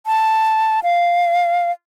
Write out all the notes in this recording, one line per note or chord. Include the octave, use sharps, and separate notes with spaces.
A5
F5